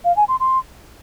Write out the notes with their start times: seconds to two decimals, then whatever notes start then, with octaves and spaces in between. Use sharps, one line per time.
0.05 F5
0.16 G#5
0.28 C6
0.40 C6